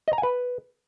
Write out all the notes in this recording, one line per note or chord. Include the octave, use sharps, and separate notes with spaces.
D#5
A#5
G#5
B4